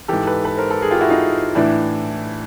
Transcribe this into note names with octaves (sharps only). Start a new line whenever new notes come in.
G#2 E3 G4 A4
A4 B4
A4 B4
A#4 C5
A4 B4
G#4 A#4
F4 G4
E4 F#4
D#4 F4
A2 E3 D4 E4